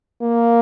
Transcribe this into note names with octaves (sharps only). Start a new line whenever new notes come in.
A#3